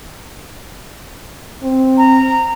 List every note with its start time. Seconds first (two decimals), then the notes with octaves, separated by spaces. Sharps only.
1.63 C4
1.98 A#5